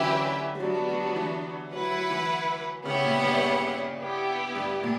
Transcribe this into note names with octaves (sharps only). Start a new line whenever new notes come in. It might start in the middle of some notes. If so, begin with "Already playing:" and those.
Already playing: D3 E3 F#3 C#4 E4 G4 B4 E5
G3
F#3 B3 D4 F#4
G3
G3
F#3
E3
F#3 E4 B4 F#5
F#3
E3
C#3 B3 E4 G4 C#5 F#5
A#2
G2
B3 E4 G4
G2
A#2